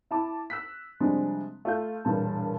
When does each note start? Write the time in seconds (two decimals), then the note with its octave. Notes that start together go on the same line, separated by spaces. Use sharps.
0.11 E4 A5 D6
0.50 E6 F#6 B6
1.00 C3 F3 G3 G#3 D4
1.65 A3 F4 G6
2.05 E1 G2 A#2 A5